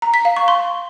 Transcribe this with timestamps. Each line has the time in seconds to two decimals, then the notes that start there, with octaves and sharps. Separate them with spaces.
0.02 A#5
0.14 B6
0.25 F5
0.36 C#6
0.48 C6